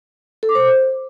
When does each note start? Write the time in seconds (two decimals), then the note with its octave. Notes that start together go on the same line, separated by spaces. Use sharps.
0.43 A4
0.49 D6
0.55 C5